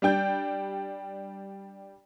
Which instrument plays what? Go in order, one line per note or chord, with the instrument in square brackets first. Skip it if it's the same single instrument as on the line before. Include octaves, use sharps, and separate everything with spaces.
[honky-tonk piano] G3 D4 G5 G6